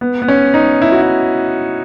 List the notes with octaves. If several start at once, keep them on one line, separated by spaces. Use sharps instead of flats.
B3
B3
C#4
D#4
E4
F#4
E4